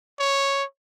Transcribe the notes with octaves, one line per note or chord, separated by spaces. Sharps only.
C#5